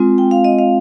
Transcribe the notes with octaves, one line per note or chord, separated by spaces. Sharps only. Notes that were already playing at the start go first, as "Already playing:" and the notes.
Already playing: G#3 C4 F4
G5
F5
D#5
F5